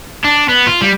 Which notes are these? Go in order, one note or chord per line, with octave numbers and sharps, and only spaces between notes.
D4
B3
F4
G3